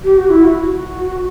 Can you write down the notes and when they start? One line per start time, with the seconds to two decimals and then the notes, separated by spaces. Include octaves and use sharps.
0.04 G4
0.18 F#4
0.30 E4
0.44 F#4